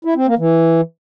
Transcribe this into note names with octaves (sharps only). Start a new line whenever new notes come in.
E4
C4
A#3
E3